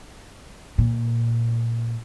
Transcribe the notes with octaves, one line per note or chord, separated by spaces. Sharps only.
A#2